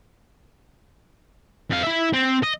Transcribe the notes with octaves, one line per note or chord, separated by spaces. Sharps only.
F2 F5
E4 E5
C4
D#5